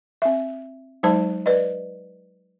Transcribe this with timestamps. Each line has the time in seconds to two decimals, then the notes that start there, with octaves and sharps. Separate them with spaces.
0.22 C4 E5
1.03 F#3 G#3 D#4 C5 A5
1.46 B4 D5 D#5